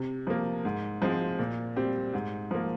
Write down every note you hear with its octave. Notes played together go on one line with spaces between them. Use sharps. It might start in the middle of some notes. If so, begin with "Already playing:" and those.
Already playing: C3
F3 A#3
G#2
F3 G#3 C4
A#2
G3 C4 G4
G#2
F3 A#3